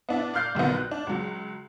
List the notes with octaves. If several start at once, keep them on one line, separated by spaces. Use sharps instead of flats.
B3 D4 E4
D5 F5 F6 G6 C7
A#1 D#3 F#3 B3
F#6
D4
C#2 F#3